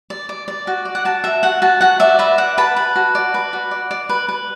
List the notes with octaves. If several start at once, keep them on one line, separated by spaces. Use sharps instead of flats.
D5
D5
D5
F#4
D5
F#5
F#4 A5
F#4 E5
F#4 F#5
F#4 A5
F#4 F#5
D5 E5
B4 E5
D5 F#5
B4 A5
B4
F#4
D5
B4 D6
F#4
D5
D5
B4
B4